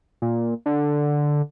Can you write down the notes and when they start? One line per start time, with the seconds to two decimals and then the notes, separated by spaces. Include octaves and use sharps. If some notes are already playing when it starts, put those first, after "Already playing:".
0.22 A#2
0.66 D3